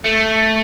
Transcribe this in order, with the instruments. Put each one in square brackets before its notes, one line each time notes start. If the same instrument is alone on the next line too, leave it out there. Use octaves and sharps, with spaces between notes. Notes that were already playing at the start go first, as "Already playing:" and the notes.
[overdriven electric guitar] A3